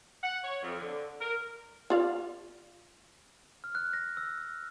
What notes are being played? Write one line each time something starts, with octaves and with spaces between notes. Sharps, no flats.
F#5
C#5
F2
D3
A#4
F4 D5 F5
F6
F#6
A#6
E6
F#6